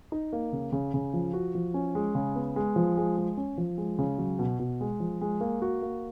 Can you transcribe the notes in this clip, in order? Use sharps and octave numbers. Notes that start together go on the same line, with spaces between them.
D#4
A#3
C#3
C#3
C#3
F3
F#4
F3
C#4
G#3
C#3
B3
G#3
F3
G#3
G#3
C#4
F3
G#3
C#3
F#3
B2
B2
G#3
F3
G#3
A#3
F#4
A#3